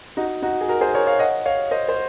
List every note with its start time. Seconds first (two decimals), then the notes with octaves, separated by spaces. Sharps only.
0.17 D#4 F#4
0.43 D#4 F#4
0.61 G#4
0.68 F#4 A#4
0.81 G#4 C5
0.94 A#4 C#5
1.07 C#5 F5
1.19 D#5 F#5
1.45 C#5 F5
1.71 C5 D#5
1.89 C5